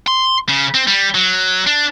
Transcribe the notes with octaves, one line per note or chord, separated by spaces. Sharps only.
C6
C#3
C4
G3
F#3
D4